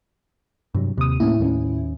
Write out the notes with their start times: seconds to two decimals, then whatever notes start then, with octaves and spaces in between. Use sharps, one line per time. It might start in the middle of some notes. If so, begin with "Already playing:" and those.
0.75 G2 C3 F#3
0.98 D#2 C3 D#6
1.20 A2 A#3 C#4 E4
1.40 D#2 A3 C#4